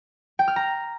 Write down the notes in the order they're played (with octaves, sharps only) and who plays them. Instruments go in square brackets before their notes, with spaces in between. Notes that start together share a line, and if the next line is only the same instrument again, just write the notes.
[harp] G5
F6
A#5